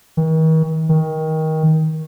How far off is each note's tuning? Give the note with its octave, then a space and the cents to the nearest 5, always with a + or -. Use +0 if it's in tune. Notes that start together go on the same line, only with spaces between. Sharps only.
D#3 +45
D#3 +20